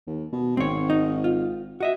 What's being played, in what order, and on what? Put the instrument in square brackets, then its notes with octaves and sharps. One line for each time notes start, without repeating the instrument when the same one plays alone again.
[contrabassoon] D#2
B2
[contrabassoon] G#1 [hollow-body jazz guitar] C4 C#5
[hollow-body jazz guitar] D#4
F4
F#4 D#5 E5